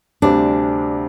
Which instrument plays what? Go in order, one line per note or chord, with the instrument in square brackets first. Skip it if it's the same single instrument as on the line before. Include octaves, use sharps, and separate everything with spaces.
[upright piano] D2 C3 G3 C4 [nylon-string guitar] D4